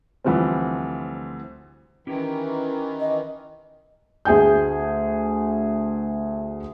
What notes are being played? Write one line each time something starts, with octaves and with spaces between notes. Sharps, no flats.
D2 E3 F3 G3 C4
D#3 E3 C#4 E4 G4
D#5
D2 G#4 G#5 G6